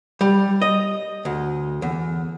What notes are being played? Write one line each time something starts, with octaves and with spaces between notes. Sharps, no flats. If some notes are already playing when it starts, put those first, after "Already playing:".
G3
D#5
D2
E2